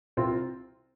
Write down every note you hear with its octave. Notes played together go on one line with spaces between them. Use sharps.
C2 C4 F4